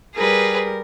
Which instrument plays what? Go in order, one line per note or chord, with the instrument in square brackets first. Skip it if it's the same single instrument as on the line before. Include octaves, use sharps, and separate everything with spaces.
[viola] G3 A#4 [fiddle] G#4 B4